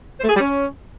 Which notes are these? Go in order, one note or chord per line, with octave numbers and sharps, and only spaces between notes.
C5
A3
G#4
G3
C#4